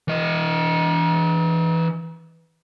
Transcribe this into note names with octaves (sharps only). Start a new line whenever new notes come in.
E3 D#5